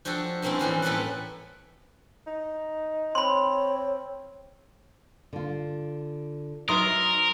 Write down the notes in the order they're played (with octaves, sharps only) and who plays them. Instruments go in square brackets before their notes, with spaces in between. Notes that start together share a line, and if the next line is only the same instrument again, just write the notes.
[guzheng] F3 D4 F#4 G4 A4
G2 G#3 A#3 C4 C#4 E4
A2 E3 G3 F4
A2 A#3 C#4 A4 B4 F#5
[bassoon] D#4
[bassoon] C4 [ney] C#5 [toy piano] B5 C6
[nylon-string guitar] D3 F4
[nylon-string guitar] F#3 B4 E5 [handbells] D#4 C6 D#6 [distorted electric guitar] A#4